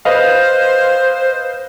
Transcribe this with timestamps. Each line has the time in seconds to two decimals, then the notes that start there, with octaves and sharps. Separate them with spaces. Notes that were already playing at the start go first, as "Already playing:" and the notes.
0.05 B4 C5 D#5 F5